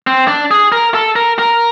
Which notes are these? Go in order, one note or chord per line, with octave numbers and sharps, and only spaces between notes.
C4
D4
G#4
A#4
A4
A#4
A#4